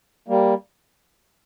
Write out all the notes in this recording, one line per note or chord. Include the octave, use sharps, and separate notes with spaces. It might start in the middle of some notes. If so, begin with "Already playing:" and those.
G3 A#3